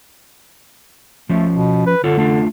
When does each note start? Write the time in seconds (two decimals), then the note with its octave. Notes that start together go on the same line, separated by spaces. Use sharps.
1.29 F3 A3 C#4
1.52 B2
1.86 B4
2.04 D3 F4 A4 C#5
2.17 A3 D4 F4